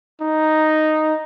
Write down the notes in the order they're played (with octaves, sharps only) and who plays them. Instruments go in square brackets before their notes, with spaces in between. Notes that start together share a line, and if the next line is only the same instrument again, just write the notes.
[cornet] D#4